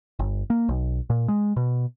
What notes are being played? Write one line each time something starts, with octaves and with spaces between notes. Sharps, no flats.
G1
A#3
B1
A#2
G#3
B2